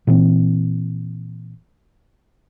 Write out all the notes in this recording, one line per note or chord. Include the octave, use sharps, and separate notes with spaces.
A#2 E3 C4